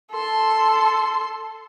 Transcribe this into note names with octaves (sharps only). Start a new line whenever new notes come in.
A4 C6